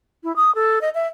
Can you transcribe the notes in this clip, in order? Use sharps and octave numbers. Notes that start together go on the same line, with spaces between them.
E4
D#6
A4
D#5
E5